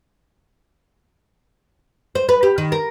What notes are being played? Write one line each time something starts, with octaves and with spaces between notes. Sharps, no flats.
C5
B4
G4
D#3
A#4